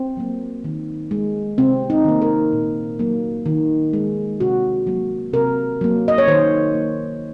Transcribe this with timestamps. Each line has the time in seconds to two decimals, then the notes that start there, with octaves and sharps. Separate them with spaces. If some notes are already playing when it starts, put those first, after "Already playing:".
Already playing: C4
0.17 F#3 A#3
0.64 D#3
1.11 G#3
1.58 C3 C4
1.90 D#4
2.05 D#3 A#3
2.22 A#4
2.53 A#2
2.99 F#3 A#3
3.46 D#3
3.93 G#3
4.40 C3 F#4
4.87 F#3 A#3
5.33 C3 A#4
5.81 F#3 A#3
6.08 D#5
6.18 C#5
6.28 D#3 C5
6.74 A#3